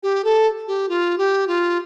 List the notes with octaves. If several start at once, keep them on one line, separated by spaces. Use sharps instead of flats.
G4
A4
G4
F4
G4
F4